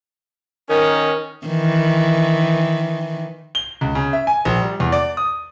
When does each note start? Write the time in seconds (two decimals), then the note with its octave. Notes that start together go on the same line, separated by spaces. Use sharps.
0.70 D#3 C#4 A#4
1.47 D#3 E3
3.55 G7
3.81 C#2
3.95 C#3
4.13 E5
4.27 G#5
4.45 A#1
4.62 G3
4.80 E2
4.92 D5
5.17 D#6